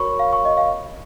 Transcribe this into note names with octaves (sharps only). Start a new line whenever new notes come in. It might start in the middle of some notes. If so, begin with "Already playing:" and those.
Already playing: F#4 A#4 C#5 B5 C#6
F5
C#6
D#5
F5